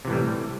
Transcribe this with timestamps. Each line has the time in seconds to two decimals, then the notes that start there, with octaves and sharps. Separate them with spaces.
0.05 C3
0.07 E3
0.10 A2
0.13 G3